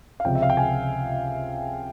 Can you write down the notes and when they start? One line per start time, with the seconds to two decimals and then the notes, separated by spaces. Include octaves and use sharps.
0.20 F5
0.25 C#2 C3 F3 G5
0.35 E5
0.42 F5
0.50 G5
0.57 G#5